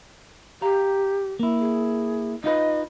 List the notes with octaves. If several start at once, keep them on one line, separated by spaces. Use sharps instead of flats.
G4 F5 A#5
A#3 E4
G#4
D#4 F4 B4 D#5